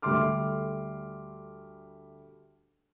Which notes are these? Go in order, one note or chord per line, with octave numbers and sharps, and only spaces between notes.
D2 G3 A3 C6 D6 F6